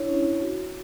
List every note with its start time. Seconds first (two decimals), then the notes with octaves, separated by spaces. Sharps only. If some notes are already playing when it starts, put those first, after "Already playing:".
Already playing: D4 E4 C#5
0.09 C#4
0.41 F#4